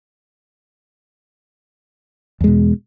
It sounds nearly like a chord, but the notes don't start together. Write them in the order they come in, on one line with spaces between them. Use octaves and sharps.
E2 G#3 B2